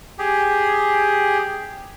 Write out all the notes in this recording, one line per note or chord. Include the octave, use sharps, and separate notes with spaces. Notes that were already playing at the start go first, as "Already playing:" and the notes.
G4 G#4